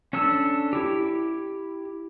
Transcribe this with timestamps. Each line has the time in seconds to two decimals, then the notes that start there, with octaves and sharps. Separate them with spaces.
0.13 C#4 D4 A4 E6
0.73 E4 G4